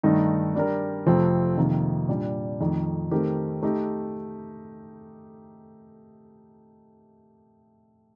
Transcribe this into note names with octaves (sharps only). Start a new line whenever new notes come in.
G2 D#3 A3 D#4
G3 D4 G4 A#4
F2 C3 F3 A3 C4
F2 C3 D#3 A#3
A#2 G3 D4
F2 D#3 A3
D#3 A3 C4 G4 A#4
A3 D#4 G4